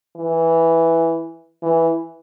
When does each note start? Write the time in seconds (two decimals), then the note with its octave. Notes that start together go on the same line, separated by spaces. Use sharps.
0.17 E3
1.63 E3